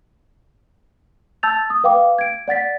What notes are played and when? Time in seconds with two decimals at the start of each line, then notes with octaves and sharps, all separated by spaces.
1.43 A5 E6 G6 A6 F7
1.70 D#6
1.84 B4 F5 G5 D6
2.19 G#6 D7
2.48 D5 F#5 A6 B6